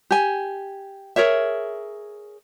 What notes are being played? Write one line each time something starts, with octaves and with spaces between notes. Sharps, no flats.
G4 G#5
G#4 A#4 C#5 E5